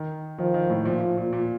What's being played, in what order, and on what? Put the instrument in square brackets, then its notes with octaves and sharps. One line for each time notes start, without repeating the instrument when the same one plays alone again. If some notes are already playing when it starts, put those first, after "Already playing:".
Already playing: [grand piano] D#3
[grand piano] D#3 [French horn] F3
[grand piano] D#3
A2
[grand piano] A#2 [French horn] F3
[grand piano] A#2
A#2
A#2